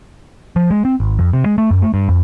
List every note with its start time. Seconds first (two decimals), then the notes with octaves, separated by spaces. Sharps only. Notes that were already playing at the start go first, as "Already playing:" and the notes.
0.56 F3
0.71 G#3
0.85 C4
1.00 G#1
1.19 F2
1.33 C3
1.46 G#3
1.58 A3
1.71 F#2
1.82 A3
1.94 G2
2.09 F2